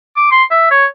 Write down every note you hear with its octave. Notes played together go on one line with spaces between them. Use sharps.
D6
C6
E5
C#5